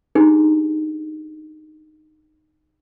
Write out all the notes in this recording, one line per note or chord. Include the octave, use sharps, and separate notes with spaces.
D4 D#4 G4 G#4